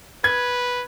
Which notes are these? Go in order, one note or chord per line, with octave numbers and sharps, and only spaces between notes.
B4 G#6